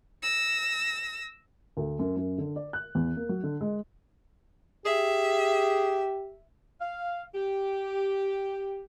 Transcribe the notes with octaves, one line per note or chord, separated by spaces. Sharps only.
E6 A#6
D2
F#2
F#2
D3
D5
F#6
E2
A#3
F#3
D3
G#3
G4 G#4 E5
F5
G4